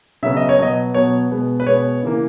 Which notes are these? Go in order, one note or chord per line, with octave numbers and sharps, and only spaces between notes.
C#3 F#3 B3 E5
D#5
C#5
B2 F#3 B3 D#5
B2 F#3 B3 C#5
B2 G#3 B3
B4
B2 G#3 B3 C#5
C#3 E3 A#3